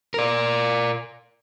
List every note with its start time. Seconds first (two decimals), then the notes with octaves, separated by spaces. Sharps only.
0.14 A#4 D5